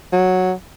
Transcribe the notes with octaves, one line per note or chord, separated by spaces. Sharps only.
F#3